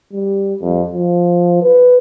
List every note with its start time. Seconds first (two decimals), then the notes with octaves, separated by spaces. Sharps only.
0.13 G3
0.61 F2
0.94 F3
1.62 B4